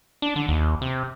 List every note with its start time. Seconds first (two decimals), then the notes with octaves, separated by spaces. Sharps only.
0.22 D4
0.36 D3
0.48 D#2
0.82 C3